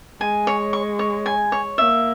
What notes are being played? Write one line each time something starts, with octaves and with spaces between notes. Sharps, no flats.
G#3 G#5
C#5
C#6
C#5
G#5
C#5
A#3 E5